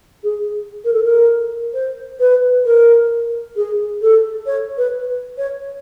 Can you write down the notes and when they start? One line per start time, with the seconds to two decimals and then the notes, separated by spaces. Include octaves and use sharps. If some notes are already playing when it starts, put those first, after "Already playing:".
0.24 G#4
0.85 A#4
0.94 A4
1.04 A#4
1.74 C5
2.20 B4
2.66 A#4
3.56 G#4
4.02 A4
4.46 C#5
4.78 B4
5.38 C#5